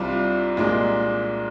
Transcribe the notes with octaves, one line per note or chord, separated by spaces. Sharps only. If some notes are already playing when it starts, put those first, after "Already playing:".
Already playing: C2 C3 G3 D4 F4
C2 A#2 G#3 D4